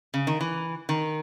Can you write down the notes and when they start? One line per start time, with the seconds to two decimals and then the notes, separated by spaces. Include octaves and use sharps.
0.14 C#3
0.27 D#3
0.41 E3
0.89 D#3